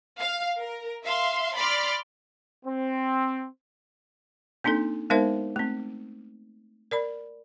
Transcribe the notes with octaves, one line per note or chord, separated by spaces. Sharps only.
F5
A#4
E5 F5 C6
D5 B5 C6 D6 F6
C4
A#3 C4 D4 D#4 A4
G#3 B3 D#4 A#4 C5 E5
A3 C4
A#4 D5 B5